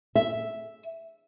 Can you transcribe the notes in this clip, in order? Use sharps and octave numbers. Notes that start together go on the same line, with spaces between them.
E5